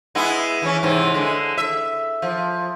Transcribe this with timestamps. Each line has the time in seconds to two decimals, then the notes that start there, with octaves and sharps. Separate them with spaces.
0.15 G#3 B3 E4
0.62 E3 C#4
0.83 G#2 C3 E3
1.14 D3 G#3
1.58 E5
2.22 F3